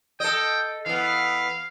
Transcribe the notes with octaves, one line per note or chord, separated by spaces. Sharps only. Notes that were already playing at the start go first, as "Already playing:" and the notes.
A4 D#5 G5
E3 B3 F5